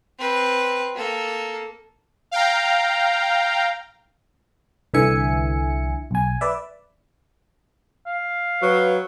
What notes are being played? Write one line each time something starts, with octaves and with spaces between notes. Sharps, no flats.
C4 B4
A#3 A4
F5 G5 A#5
C2 D3 E3 E5 G#5 C#7
B1 G#5
B4 D5 E5
F5
F#3 B4